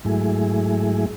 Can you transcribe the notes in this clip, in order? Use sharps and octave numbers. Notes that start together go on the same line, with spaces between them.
G#2 F#3 A3 E4 G#4